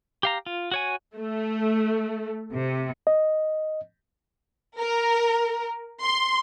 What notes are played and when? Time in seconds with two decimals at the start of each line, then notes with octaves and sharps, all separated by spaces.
0.23 G4 F5 A#5
0.46 F4
0.71 F#4 C#5 G#5
1.18 A3
2.55 C3
3.07 D#5
4.79 A#4
6.03 C6